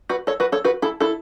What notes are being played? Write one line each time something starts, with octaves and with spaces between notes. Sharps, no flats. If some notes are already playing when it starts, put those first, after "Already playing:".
F#4 B4
A4 C#5
F#4 B4
A4 C#5
F#4 B4
E4 A4
E4 A4